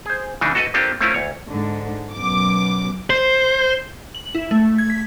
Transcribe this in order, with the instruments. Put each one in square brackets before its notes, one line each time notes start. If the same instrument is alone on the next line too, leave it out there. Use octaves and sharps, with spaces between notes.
[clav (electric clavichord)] G#4 C5
C#3 E3 D4 D#4
F#4 A4 B4 D#5
A#3 C4 D4 F4 G4 A4
A3 A#3 C4 C#4 E4 F4
D2 C#5
[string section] G#2 D3
F#2 B2 D6
[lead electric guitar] C5
[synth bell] F#7
E4
A3
G#6
B6